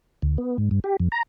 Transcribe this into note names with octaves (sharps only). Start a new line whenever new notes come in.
D2
B3
G#2
G2
G4
F2
A#5